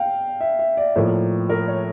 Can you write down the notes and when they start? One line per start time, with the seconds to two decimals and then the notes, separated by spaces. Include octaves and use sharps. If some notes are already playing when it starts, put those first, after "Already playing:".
Already playing: F5 G5
0.41 E5
0.59 E5
0.77 D5
0.96 A2 F3 A#3
1.50 A#4
1.68 C#5